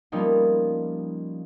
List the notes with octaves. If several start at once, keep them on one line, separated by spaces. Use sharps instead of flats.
F3 G3 A#3 B3 C#4 D#4